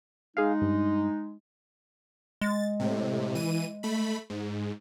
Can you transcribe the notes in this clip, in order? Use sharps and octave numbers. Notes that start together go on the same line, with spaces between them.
G#3 D#4 G#4 F5
G2
G#3 A6
A2 C3
E3 D#7
A3 B5
G#2